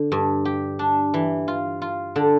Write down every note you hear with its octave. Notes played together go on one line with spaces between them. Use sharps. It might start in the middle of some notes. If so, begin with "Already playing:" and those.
Already playing: D3
G2
G4
D4
E3
F4
F4
D3